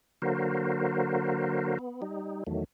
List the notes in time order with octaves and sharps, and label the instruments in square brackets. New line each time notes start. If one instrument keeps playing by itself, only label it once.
[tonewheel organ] D3 F#3 A#3 F#4 A#4 C5
B3
G3 D#4
E2 D#3 F#3 A3